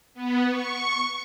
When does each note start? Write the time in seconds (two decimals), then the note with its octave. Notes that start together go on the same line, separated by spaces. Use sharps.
0.14 B3
0.49 C#6